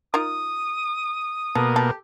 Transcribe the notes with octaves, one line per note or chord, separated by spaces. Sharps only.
D#4 F4 A#4 D#6
B2 A#3 A4
G4 A4